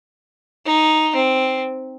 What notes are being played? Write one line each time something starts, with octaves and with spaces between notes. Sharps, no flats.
D#4
C4